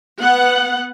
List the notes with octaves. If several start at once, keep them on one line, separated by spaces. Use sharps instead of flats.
B3 F#5